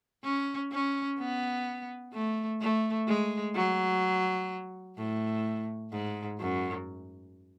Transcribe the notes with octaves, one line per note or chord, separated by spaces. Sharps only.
C#4
C#4
B3
A3
A3
G#3
F#3
A2
G#2
F#2